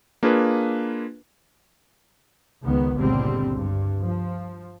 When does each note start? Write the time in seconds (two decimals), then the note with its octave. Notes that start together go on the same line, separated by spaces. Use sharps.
0.23 A#3 D4 F4 G#4 B4
2.63 C#2 D#3 B3
2.95 G1 C#2 A#2 D3 G3 C4
3.54 G2
4.03 F3